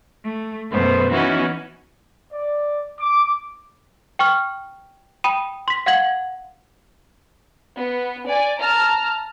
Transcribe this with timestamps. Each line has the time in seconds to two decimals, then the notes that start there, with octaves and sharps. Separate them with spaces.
0.23 A3
0.71 F#2 B2 A3 B3 C5
1.11 E3 B3 C#4 D#4 E4 F#4
2.32 D5
3.00 D6
4.19 G5 C#6 F6
5.24 G5 B5 D#6 D#7
5.68 C6 B6
5.86 F5 F#5 G#6 F#7
7.76 B3
8.29 D5 G#5
8.59 A5 A#5 F6